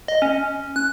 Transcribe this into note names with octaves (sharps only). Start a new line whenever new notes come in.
D#5
C#4
F#6